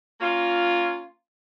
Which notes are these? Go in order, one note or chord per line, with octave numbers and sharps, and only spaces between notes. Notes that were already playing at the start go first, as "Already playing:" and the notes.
A#3 C#4 F4